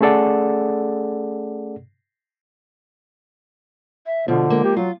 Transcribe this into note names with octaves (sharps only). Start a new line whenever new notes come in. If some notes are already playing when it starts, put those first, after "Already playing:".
A3 C#4 G#4 A4 D5 F#5
E5
B2 D3 F3 B3
G#3 A#3
G4
F#3 F4